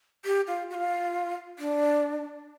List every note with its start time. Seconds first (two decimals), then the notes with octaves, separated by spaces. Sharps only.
0.25 G4
0.47 F4
0.70 F#4
0.74 F4
1.59 D4